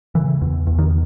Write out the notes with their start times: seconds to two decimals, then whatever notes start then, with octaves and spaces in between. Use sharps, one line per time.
0.15 C#3 E3
0.42 E2
0.67 E2
0.79 D#3